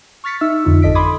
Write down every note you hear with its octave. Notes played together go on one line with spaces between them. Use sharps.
C#6 F6 A6 B6 C#7
D#4 E5 E6 F6
F2 D3 D#4 F4
G#1 A4 D#5 B6 D7
B5 C6 D6 D#6 G#6